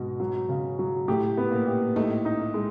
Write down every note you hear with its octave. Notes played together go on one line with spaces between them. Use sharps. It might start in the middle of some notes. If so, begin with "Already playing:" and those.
Already playing: G#2 B2 G#3
F#3
C#3
F#3
A2 A3 G4
B3
A#2 A#3
G4
A2 A3 D#4
D#4
G#3